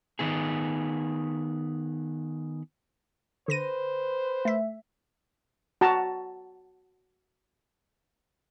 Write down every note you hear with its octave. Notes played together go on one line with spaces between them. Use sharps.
D#3 B3 G#4
D3 B4 C5 A#6 D#7
A3 E5
F#4 A5 A#5